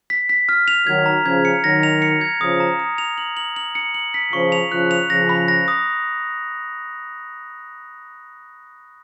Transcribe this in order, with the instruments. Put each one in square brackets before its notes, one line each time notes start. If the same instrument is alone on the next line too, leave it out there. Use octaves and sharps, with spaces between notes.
[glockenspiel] B6
B6
F6
F7
[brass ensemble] D#3 F#3 [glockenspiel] G#6
[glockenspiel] A#5
[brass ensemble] C#3 F3 [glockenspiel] G#6
[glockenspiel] C#7
[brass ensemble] D#3 F#3 [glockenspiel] A#6
[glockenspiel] F7
C#7
G#6
[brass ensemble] C#3 F3 [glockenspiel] D#6
[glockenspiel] A#5
D#6
F7
F#7
F#7
F#7
C#7
F#7
B6
[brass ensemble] C#3 F3 [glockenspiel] C#6
[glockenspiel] F7
[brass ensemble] C#3 F3 [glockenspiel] F#6
[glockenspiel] F7
[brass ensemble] C#3 F3 [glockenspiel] A#6
[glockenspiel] B5
A#6
D#6